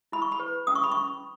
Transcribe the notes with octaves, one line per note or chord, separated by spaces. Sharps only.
E4 B5
C#6
B5
B4
C#4 D#6
C#6
B5
C#4 C#6